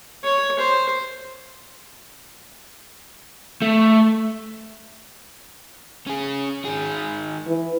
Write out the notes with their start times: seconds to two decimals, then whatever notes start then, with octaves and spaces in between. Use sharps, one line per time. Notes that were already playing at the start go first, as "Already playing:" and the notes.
0.23 C#5
0.59 C5
3.62 A3
6.07 C#4 G#4
6.65 D#3 G#4
7.47 E3